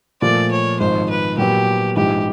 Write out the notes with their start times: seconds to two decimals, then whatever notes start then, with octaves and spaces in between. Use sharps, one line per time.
0.22 A#2 F3 A3 D5
0.51 C#5
0.80 G#1 G#2 F3 C5
1.10 B4
1.37 A#2 F#3 B3 G4
1.96 A#1 G#2 E3 G4